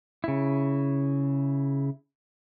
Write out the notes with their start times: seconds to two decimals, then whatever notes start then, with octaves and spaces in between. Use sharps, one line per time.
0.24 C#3 E4